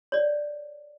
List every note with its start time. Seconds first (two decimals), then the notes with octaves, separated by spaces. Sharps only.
0.12 C#5 D5